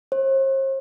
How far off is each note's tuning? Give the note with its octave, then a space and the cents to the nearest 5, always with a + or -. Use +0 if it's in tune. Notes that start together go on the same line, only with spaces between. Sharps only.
C5 +45